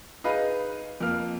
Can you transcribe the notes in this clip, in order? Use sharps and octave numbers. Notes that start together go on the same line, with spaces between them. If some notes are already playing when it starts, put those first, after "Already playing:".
D#4 G#4 B4 D#5 F5
F2 A#3 F6